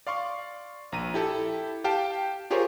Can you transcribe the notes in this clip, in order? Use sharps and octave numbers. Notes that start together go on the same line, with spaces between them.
D5 F5 C6 C#6
A#1 A#5 D#7
E4 G4 A4
G4 F5 G5 A5
F4 G4 G#4 A#4 C5 C#5